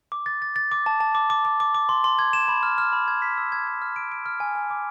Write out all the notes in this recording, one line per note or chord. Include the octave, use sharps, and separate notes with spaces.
D6
A6
A6
A6
D6
A5
A5
D6
D6
D6
D6
D6
C6
C6
G#6
E7
B5
F6
F6
B5
G#6
B6
E6
G#6
G#6
F6
D7
D7
F6
G#5
G#5
D6